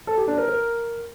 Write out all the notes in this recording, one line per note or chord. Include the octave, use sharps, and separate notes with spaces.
A4
G4
D4
A#4
A#4